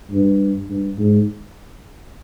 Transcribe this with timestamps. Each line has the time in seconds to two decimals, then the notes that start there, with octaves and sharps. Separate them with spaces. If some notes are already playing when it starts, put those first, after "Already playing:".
0.11 G2
0.69 G2
0.98 G#2